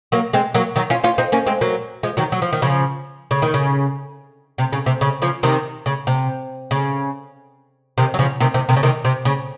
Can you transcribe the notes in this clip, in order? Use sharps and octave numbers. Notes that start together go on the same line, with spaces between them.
F#3 A#3
G#3 C4
F#3 A#3
D#3 F#3
C#4 F4
C#4 F4
C4 D#4
A#3 C#4
G#3 C4
F#3 A#3
F3 G#3
D#3 F#3
F#3
F3
D#3
C#3 F3
C#3
D#3
C#3
C3
C#3
C3
C#3
C#3 F3
C3 D#3
C#3
C3
C#3
C3 D#3
F#3
C#3 F3
C3 D#3
C3 D#3
C3 D#3
C#3
C3 D#3
C3
C#3